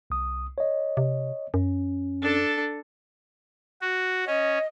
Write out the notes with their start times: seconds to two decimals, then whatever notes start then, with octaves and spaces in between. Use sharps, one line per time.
0.10 C2 D#6
0.58 C#5 D#5
0.97 C3
1.54 F#2 C#4
2.22 D4 A4
3.82 F#4
4.27 C#4 D#5